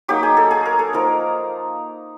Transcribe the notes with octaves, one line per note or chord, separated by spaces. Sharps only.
F#3 A#3 D#4 G4
G#4
A4
G#4
A#4
A4
F3 A#3 D#4 A#4